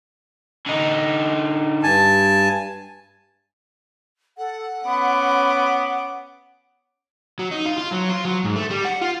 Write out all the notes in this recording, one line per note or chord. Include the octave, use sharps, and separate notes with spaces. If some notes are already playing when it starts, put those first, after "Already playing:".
D3 D#4
G2 G#5 A5
A4 F#5
B3 C#4 B5 D6
F#3
D#4
F4
F4
F#3
F4
F#3
G#2
A3
G3
F#5
F4